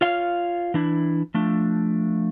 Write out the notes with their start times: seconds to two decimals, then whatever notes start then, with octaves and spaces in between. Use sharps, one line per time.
0.01 F4 C#5 F5
0.74 E3 D4 E4
1.34 F3 A3 D4